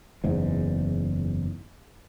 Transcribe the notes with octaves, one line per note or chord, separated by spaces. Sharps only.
F#1 E2 G#2